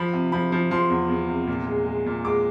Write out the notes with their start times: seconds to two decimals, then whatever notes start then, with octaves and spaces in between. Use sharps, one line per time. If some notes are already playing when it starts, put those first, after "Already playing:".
Already playing: F3 B5
0.13 C3
0.32 F3 B5
0.52 F3
0.71 F3 C6
0.90 E2
1.09 E2
1.28 C3
1.47 A#2
1.67 G#3
1.86 G#3
2.06 A#2
2.24 G#3 D6